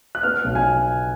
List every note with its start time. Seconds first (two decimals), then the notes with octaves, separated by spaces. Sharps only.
0.15 F#6
0.23 B3 F6
0.44 B1
0.55 G#5